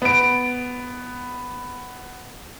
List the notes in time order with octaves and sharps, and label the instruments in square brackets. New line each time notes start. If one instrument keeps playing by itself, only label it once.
[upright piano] B3 D7